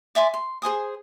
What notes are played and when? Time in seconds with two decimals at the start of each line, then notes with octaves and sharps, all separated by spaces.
0.15 D5 E5 G#5 C6
0.34 C6
0.62 G#4 C5 G#5 D#6